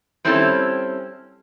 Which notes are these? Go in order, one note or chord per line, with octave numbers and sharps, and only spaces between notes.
G3 C4 C#4 E4 A4